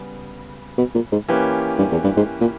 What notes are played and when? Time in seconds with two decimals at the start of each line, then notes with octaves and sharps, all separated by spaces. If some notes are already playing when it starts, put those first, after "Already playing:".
Already playing: C#3 G3 B3
0.78 B2
0.94 A#2
1.12 G#2
1.28 E3 A#3 C#4 G4 B4
1.79 G2
1.92 E2
2.04 G2
2.17 G#2
2.41 A#2